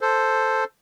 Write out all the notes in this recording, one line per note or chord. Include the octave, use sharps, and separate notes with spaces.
A4 C5